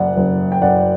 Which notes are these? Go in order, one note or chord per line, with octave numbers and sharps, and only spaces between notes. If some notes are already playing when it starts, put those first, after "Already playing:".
Already playing: F#1 D5 F#5
F#1
G5
F#2 D5 F#5